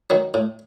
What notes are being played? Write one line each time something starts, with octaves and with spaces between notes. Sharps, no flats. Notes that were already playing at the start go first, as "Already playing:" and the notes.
D#3 F#3
A2